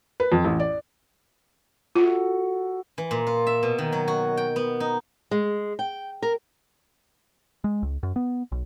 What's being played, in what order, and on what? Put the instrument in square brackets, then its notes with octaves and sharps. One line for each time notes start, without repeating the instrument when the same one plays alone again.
[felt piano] B4
F2
A1
D5
[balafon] F4 [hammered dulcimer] F#4 A4
[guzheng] E3
A#2
F4
E5
B2
D#3
F#3
F#4
G5
B3
D#4
[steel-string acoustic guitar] G#3
G5
A#4
[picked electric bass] G#3
C#2
F#2
B3
B1